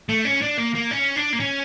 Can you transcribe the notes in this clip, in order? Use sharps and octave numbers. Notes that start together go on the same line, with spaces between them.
A3
C#4
D4
A#3
A#3
C#4
D4
A#3
C#4